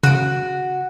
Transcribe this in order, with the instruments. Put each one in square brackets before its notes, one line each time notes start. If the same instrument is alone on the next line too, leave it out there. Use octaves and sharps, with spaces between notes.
[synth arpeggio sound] C#3 D7 [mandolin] F#4